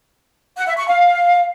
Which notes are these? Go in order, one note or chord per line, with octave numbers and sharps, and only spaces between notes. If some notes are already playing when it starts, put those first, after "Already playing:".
F#5
E5
C#6
F5